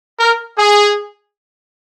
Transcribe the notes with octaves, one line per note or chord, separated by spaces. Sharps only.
A#4
G#4